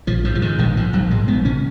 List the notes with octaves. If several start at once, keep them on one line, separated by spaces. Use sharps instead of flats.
A#1 F3
G#2 F3
F3
G#2 D#3
A#1 D#3
G#2 F3
A#1 F#3
G#2 G#3
A#1 B3
C#3 C#4